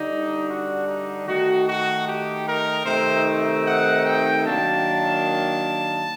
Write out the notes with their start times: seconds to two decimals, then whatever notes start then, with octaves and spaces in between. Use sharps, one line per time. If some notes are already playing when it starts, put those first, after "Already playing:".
Already playing: D3 G3 D4 D#4
0.47 F#4
0.86 D#4
1.26 D#3 A3 D#4 F#4
1.66 F#4
2.06 G4
2.46 A#4
2.85 C3 D#3 A3 C4 D#4 C5
3.65 F#5
4.05 G5
4.45 D#3 F#3 A#3 D4 A5